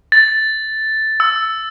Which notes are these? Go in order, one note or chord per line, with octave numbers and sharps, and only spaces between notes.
A6
E6